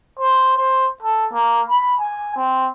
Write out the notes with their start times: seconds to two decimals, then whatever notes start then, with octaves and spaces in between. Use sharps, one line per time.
0.19 C5
0.57 C5
1.03 A4
1.33 A#3
1.69 B5
2.00 G#5
2.36 C4